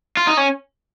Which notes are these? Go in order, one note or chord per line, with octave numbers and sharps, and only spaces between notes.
F4
D#4
C#4